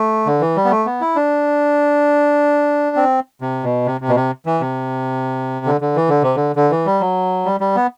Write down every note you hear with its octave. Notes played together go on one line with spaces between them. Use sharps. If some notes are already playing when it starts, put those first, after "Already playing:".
Already playing: A3
D3
E3
G3
B3
A3
B3
E4
D4
C4
C3
B2
C3
C3
B2
C3
E3
C3
D3
D3
E3
D3
C3
D3
D3
E3
G3
F#3
G3
G3
B3